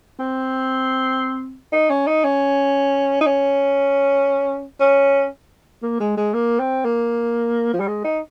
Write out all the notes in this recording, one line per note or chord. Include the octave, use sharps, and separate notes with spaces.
C4
D#4
C#4
D#4
C#4
D#4
C#4
C#4
A#3
G#3
G#3
A#3
C4
A#3
F3
G3
G#3
D#4